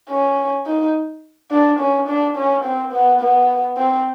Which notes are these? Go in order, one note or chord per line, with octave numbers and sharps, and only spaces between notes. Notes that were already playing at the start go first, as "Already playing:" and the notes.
C#4
D#4
D4
C#4
D4
C#4
C4
B3
B3
C4